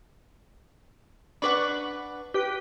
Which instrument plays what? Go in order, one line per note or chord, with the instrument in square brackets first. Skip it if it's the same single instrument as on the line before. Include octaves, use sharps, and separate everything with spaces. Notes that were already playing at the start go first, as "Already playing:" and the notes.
[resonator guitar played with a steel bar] D4 B4 F#5 [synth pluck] B5 C#6 D6
[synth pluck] G4 B4 G5